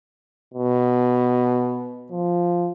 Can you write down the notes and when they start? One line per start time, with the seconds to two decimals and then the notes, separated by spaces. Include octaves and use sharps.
0.54 B2
2.11 F3